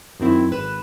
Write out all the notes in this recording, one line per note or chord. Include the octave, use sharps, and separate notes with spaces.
F#2 D#3 C4 E4
G#1 B4 E7